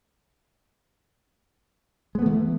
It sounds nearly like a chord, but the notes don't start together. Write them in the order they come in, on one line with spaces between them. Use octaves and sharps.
G#3 B3 A3 E3